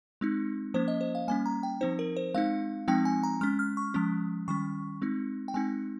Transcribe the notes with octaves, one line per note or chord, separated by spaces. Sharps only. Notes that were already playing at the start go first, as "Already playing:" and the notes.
G#3 C4 D#4
F3 A#3 C#4 C5
D#5
C5
F5
G3 A#3 C#4 G#5
A#5
G5
F3 C4 D#4 C5
A#4
C5
G#3 C4 D#4 F5
F3 G#3 C4 D#4 G5
G#5
A#5
G#3 C#4 F6
F6
C#6
F3 G#3 C#4
D#3 G3 C#4 C#6
G#3 C4 D#4
G5
G#3 C4 D#4 G#5